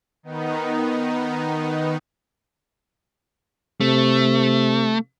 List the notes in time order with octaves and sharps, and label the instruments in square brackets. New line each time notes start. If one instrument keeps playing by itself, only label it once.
[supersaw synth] D#3 B3 D#4
[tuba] C3 [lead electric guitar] A3